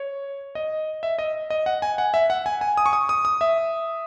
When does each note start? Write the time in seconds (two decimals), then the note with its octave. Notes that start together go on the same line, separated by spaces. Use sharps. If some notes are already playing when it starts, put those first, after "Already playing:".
Already playing: C#5
0.55 D#5
1.03 E5
1.19 D#5
1.50 D#5
1.66 F#5
1.82 G#5
1.98 F#5
2.14 E5
2.30 F#5
2.46 G#5
2.61 G#5
2.77 D#6
2.86 C#6
2.93 D#6
3.09 D#6
3.25 D#6
3.41 E5